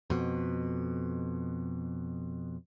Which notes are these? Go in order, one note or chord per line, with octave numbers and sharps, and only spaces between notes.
F2 B2